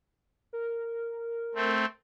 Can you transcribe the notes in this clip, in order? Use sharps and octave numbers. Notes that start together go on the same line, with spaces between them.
A#4
A3 C4